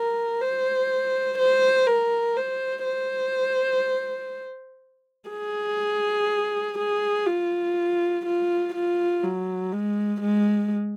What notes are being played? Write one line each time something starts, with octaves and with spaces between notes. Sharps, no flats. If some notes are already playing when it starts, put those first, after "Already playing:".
Already playing: A#4
C5
C5
A#4
C5
C5
G#4
G#4
F4
F4
F4
F#3
G#3
G#3